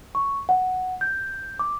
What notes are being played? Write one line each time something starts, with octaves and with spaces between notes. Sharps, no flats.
C#6
F#5
G6
D6